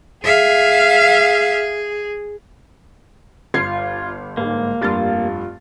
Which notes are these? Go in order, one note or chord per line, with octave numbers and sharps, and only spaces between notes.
G#4 E5 F5
G1 F4 G#6 C7
G#2 A#3
F1 G2 F4 A6